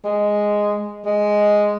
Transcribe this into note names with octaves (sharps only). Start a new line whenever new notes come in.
G#3
G#3